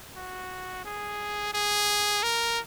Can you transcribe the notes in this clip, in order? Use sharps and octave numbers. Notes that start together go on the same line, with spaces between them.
F#4
G#4
G#4
A#4